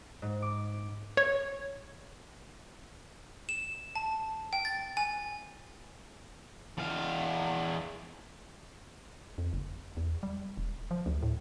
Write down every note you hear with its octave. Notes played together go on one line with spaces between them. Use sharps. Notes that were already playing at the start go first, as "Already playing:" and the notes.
G#2
D6
C#5
E7
A5
G5
A6
G#5
E2 F5
F2
F#1
E2
G3
E1
F3
D2
A2